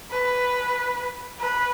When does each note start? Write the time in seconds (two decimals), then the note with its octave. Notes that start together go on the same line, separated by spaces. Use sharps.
0.11 B4
1.40 B4